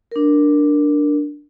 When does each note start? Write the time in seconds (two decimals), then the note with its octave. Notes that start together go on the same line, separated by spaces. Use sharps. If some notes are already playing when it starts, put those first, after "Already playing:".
0.11 D4 A#4